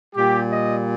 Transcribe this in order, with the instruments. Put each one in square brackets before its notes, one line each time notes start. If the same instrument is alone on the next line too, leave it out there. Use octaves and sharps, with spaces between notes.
[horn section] A#2 G3 G4
D#5